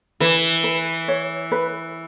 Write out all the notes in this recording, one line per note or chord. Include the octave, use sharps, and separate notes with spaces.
E3 B4
B4
C#5
B4